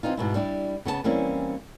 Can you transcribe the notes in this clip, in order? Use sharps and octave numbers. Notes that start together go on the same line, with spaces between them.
E3 G3 C4 D#4 F4
G#2 B2 E4
G3 D4 E4 G4
C#3 B3 G#4 A5
E3 G3 A#3 C4 C#4